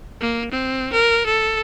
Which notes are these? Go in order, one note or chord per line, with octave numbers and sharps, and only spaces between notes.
A#3
C4
A#4
A4